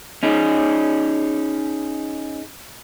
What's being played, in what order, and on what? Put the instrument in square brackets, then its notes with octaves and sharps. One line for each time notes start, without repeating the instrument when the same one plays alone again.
[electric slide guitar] C#4 D#4 G#4